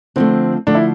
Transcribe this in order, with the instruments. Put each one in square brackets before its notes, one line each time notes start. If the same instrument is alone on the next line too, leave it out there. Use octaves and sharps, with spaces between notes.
[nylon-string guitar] D3 F3 A3 [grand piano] C4
[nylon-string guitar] D3 F3 A3 [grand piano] D4
[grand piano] E4